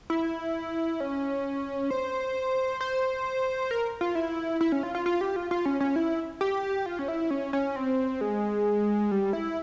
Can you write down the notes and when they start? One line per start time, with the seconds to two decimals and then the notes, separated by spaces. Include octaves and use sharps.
0.10 E4
1.00 C#4
1.91 C5
2.81 C5
3.71 A#4
4.01 F4
4.15 E4
4.61 E4
4.72 C#4
4.83 F4
4.95 F4
5.06 F4
5.21 G4
5.36 F4
5.51 F4
5.66 C#4
5.80 C#4
5.96 E4
6.41 G4
6.86 F4
6.99 C#4
7.08 E4
7.31 C#4
7.53 C#4
7.76 C4
8.21 G#3
9.11 G3
9.33 E4